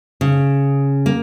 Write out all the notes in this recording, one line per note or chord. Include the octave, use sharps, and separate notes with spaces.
C#3
A#3